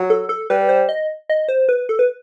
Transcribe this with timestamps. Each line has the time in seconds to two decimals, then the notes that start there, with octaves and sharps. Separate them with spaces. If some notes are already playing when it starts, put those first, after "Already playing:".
Already playing: F#3
0.10 A4
0.29 A4
0.50 G3 B4
0.69 C5
0.89 D#5
1.29 D#5
1.48 C5
1.69 B4
1.89 A4
1.99 B4